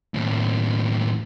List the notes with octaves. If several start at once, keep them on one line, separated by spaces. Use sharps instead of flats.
D#2 A2